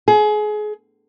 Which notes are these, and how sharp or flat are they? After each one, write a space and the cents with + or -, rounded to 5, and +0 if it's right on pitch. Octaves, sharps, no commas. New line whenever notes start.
G#4 +30